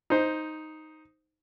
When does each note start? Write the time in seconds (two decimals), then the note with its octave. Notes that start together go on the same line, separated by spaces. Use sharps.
0.10 D#4 C5